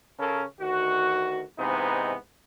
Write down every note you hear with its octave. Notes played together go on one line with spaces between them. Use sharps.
C#3 C#4 A4 A#4
D2 D#3 F#4
G#2 C3 E3 B3 D#4